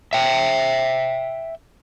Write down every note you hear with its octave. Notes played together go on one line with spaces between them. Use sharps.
E5 G5